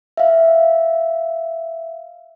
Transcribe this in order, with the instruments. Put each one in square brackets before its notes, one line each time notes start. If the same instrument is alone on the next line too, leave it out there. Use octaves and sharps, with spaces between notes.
[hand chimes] E5 F5